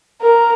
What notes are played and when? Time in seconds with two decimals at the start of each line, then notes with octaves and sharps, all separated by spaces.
0.20 A#4